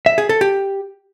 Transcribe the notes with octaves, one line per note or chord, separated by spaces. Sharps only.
E5
G#4
A4
G4